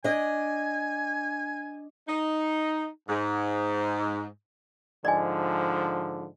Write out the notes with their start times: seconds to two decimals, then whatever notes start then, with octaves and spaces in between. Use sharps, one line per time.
0.04 D4 D#5 G#5
2.08 D#4
3.08 G#2
5.05 G#2 D3 F3 D5 D#5 G#5